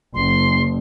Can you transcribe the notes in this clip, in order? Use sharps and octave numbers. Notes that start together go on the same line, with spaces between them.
F#1 C6